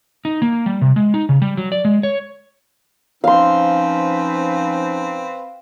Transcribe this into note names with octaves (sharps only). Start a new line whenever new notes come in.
D#4
A#3
G3
C3
G#3
D#4
C#3
G3
F#3
D5
G#3
C#5
F3 C4 C#4 D#4 B4 F5 C6